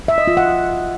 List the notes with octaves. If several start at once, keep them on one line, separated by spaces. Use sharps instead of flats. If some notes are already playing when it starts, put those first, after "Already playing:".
E5
D#5
F4
F#5